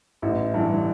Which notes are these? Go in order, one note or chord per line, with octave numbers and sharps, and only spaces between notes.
A1 E4
G2 E3